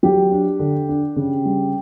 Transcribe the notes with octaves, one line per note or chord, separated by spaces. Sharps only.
F#3 G4
D4
D3
D4
C#3
G3